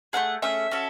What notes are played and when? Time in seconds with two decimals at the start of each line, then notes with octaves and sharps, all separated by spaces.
0.13 A3 C#4 G#4 F#5
0.42 A3 C#4 G#4 E5
0.71 C#4 F#4 A4